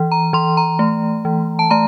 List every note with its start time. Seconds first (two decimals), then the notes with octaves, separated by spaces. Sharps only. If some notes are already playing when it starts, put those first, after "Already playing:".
Already playing: E3
0.12 A#5
0.33 E3 C6
0.57 A#5
0.79 A3
1.25 E3
1.59 A5
1.70 A3 A#5